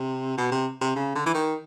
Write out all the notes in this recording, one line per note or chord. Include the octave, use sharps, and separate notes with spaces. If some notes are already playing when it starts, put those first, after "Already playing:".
Already playing: C3
B2
C3
C3
C#3
D3
E3
D#3